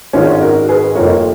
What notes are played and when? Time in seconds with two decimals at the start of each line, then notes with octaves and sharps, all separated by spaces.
0.13 G#1 G#2 D#3 C#4 F4
0.41 F#4 A#4
0.68 G#4 B4
0.95 F1 F2 F3 A#3 A#4 C#5